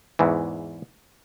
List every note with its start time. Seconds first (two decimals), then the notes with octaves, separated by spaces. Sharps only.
0.19 E2 G#2 E3